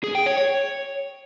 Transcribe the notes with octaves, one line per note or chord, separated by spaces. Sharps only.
G#4
G5
C#5
C#5